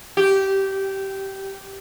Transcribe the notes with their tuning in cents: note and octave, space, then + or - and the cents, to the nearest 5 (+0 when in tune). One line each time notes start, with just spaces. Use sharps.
G4 -15